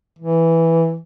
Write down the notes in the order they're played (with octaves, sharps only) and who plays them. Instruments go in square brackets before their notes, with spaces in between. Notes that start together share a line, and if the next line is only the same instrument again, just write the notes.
[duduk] E3